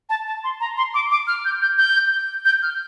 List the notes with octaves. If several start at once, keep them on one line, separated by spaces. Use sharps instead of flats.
A5
A5
C6
A#5
C6
D6
D6
F6
G6
G6
G6
G6
F6